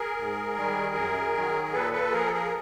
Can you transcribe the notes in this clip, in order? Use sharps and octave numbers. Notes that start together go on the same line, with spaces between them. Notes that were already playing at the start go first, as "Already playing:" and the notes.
Already playing: G#4 A#4
G#2
D#3 G3
F#2
D#3 F#3
A#4
A#2 A4 B4
A4 B4
F3 G#4 A#4
A4
G#4 A#4